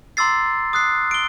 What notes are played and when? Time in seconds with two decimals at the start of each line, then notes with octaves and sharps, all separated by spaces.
0.17 A#5 C6 D6 E6 A6 C7
0.73 D#6 F#6 C7
1.11 D7 G7